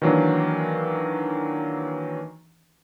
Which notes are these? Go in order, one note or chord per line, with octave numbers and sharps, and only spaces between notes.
D#3 E3 F#3 A#3 D4 D#4